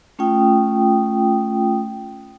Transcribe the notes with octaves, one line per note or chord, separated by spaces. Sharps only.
A3 C#4 F4 G5 D#6